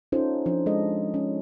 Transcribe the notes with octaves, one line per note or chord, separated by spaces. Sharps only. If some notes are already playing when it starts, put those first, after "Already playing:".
C#4 D#4 F4 A4 C5
F3 D4
G#3 A4 D#5
C#4